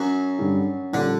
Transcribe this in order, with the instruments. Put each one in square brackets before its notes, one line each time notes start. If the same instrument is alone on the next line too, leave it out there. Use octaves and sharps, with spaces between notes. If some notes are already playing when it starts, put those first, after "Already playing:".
Already playing: [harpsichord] F#2 F#3
[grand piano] G2 D3 G3
[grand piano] A#1 A#2 G3 C#4 [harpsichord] D3